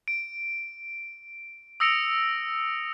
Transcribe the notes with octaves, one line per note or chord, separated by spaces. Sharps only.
D7
D#6 E6 A#6 C#7 D7 F7